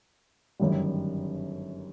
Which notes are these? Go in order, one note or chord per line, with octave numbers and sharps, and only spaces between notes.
G1 F#2 D#3 G3